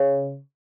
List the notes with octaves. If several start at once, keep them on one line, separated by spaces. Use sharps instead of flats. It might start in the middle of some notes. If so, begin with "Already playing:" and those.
Already playing: C#3